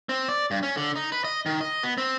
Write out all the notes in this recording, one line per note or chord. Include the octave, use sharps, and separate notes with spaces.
C4
D5
G2
C#4
D3
D#4
B4
D#5
D#3
D#5
B3
C4